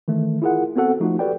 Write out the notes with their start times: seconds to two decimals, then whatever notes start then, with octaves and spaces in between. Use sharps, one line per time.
0.08 D#3 E3 A3
0.42 E4 F4 G#4 A#4 F#5
0.76 B3 C4 F#4 A4 F#5
1.00 F3 A3 D#4 F4 F#4
1.19 F#4 G4 A4 B4 D5 G5